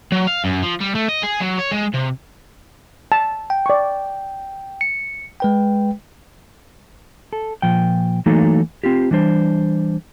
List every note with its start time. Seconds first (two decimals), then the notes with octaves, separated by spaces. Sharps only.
0.12 F#3
0.28 F5
0.45 F#2
0.63 F3
0.81 G3
0.95 A3
1.09 D#5
1.24 G#4
1.41 F#3
1.59 C#5
1.72 G#3
1.94 C3
3.12 A5
3.50 G5
3.66 D5 C#6
4.81 C#7
5.40 G#3 B4 G5
7.33 A4
7.62 A#2 F3 G5
8.26 E3 F#3 A3 A#3 D#4 A4
8.84 C4 F4 G4
9.11 E3 G3 D4 C5